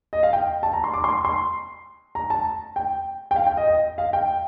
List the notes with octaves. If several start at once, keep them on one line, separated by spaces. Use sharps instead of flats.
D#5
F5
G5
A5
A#5
C6
D6
C6
C6
A#5
A5
G5
G5
F5
G5
D#5
D#5
F5
G5